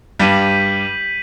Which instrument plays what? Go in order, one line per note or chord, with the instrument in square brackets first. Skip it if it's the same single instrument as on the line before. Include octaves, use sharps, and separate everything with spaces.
[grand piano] G2 G3 [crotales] G6 B6 D#7 F#7